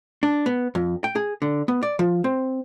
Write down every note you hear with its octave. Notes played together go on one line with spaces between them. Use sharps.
D4
B3
F2
G5
G#4
D3
B3
D5
F3
C4